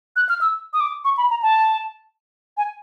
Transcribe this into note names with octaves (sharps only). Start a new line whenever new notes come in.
F#6
F6
E6
D#6
D6
C#6
B5
A#5
A5
G#5